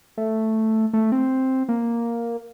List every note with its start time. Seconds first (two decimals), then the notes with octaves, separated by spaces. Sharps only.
0.18 A3
0.93 A3
1.12 C4
1.69 A#3